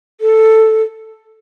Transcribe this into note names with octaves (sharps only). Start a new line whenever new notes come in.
A4